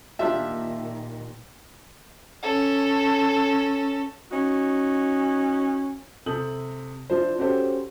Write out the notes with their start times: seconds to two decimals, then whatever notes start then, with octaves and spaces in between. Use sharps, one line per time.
0.19 A#2 D#3 D4 F4 G4 E5
2.42 C#4 A4
4.31 C#4 D#4 F#4
6.26 C3 A4 D#6 G6 F#7
7.10 F3 D4 E4 C5
7.38 C#4 F#4 G4 A4 C5